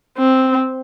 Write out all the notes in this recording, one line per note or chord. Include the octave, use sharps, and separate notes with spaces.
C4